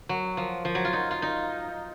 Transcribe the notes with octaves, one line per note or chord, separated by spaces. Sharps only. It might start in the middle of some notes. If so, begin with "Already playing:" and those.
F#3
F3
F3
F#3
F4
D#4
F4
D#4